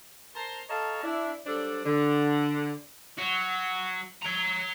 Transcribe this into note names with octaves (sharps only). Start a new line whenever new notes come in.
A#4 C5 A5 A#5 C6
A4 C#5 D#5 F5 A5 A#5
D4 E4
F#3 G3 D4 A4 C5 D5
D3
F#3 F#4
C#5 A#5